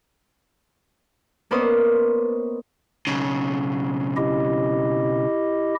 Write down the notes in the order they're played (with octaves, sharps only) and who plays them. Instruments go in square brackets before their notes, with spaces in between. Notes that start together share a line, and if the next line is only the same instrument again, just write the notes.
[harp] A#3 B3 C#4 C5 D5 D#5
[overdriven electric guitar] B1 C#3
[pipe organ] E4 G4 D#5